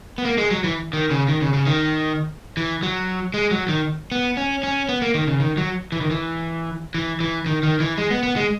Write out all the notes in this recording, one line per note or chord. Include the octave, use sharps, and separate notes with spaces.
B3
A#3
G#3
F#3
E3
D#3
C#3
D#3
C#3
C#3
D#3
E3
F#3
G#3
F#3
D#3
B3
C#4
C#4
B3
A#3
D#3
C#3
D#3
F#3
E3
D#3
E3
E3
E3
D#3
D#3
E3
G#3
B3
B3
G#3